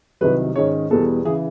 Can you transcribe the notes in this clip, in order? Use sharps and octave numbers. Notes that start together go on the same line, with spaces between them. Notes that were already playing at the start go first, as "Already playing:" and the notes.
C2 C3 D#3 F#3 B4
G#2 D#3 G#3 C#4 C#5
E2 B2 G3 B3 A4
C#3 E3 G#4